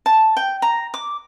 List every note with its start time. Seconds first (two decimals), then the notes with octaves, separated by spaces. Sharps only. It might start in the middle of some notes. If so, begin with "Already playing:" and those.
0.06 A5
0.37 G5
0.62 A#5
0.94 D6